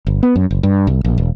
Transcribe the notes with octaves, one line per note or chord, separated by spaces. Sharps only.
G1
B3
F#2
F#1
G2
C2
A#1
E1